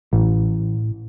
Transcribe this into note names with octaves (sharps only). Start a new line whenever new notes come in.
A1 A2